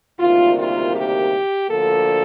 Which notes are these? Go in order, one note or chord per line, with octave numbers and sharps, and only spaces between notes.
D2 C3 D#3 G3 A#3 F4
F4
G4
D2 D3 F3 A#3 A4